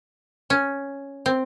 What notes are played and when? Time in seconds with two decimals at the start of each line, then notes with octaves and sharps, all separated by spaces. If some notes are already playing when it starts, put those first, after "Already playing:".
0.50 C#4
1.26 C4